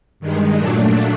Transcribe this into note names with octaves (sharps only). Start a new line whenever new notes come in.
G2 D#3 G#3
A#2 F#3 A3 D4